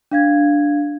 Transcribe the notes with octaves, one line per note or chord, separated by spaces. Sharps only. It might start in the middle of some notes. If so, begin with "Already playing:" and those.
D4 F5 G#6